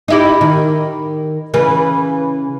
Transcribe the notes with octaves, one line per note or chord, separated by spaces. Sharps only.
D#4 E4 G4
D#3
C#3 E3 B4